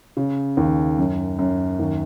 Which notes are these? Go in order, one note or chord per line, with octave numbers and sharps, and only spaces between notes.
C#3
D#2
F#2
F#2
D#2